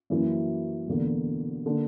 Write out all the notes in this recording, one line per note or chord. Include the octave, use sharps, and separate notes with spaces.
F#2 E3 A#3 E4
E1 E2 D3 A#3
D3 A#3 D4